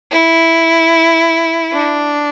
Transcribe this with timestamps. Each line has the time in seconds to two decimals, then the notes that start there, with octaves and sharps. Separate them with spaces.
0.11 E4
1.73 D4